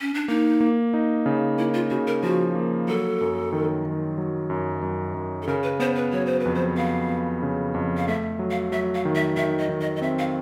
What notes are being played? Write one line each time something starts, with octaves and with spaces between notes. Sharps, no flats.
C#4
D4
A#3 D#4
A#3
D#4
C#3
A#3 E4
F4
C#3 F#4
A#4
F3 F#4
A#3
F#3 A4
F#2
D#3
D#3
F#3
F#2
F#2
F#2
A4
C#3 A#4
B4
B3 C5
B4
F#3 C#5
C5
B4
F2
C5
B3 F5
B3
C#3
F2
F5
A3 E5
F#3
F5
F#3 E5
F5
D#3
E5
D#3 E5
D#5
D#3
D#5
D#5
C4 E5
F5